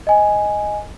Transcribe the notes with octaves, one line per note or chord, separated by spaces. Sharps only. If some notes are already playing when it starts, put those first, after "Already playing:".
D#5 G#5